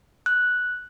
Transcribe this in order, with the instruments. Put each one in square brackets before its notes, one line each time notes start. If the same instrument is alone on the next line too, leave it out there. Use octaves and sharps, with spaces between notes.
[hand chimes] F#6